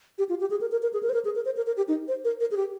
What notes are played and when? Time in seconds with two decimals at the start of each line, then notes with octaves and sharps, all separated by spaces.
0.18 G4
0.29 F4
0.41 G4
0.50 G#4
0.61 A#4
0.72 A#4
0.83 A#4
0.93 G#4
1.03 A#4
1.09 C5
1.14 A#4
1.25 G#4
1.35 A#4
1.45 C5
1.57 A#4
1.67 A#4
1.77 G4
1.88 D#4
2.08 C5
2.25 A#4
2.40 A#4
2.51 G#4
2.57 G4